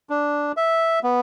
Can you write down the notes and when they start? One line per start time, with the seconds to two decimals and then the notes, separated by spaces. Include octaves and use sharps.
0.10 D4
0.57 E5
1.03 B3